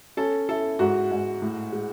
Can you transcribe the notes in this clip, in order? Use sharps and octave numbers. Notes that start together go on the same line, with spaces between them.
C#4 A4
E4 A4
G#2 F#4
G#2
A2
G#3